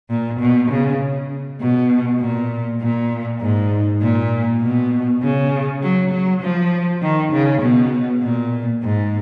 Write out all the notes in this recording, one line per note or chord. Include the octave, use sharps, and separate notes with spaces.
A#2
B2
C#3
B2
A#2
A#2
G#2
A#2
B2
C#3
F#3
F#3
F3
D#3
C#3
B2
A#2
G#2